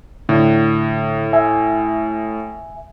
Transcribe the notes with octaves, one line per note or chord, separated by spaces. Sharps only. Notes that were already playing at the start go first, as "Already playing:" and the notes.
A2 D3
E5 G#5